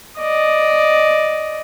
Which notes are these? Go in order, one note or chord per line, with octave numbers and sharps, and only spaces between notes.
D5 D#5